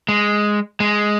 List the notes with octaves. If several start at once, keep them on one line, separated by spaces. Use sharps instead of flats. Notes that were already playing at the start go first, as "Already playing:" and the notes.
G#3
G#3